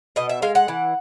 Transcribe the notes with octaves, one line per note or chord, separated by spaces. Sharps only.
B2 D#5
E5
G#3 F5
F#5
E3